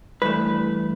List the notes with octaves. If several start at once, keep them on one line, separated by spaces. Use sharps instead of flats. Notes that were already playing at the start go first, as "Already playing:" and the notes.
G2 E3 A3 B4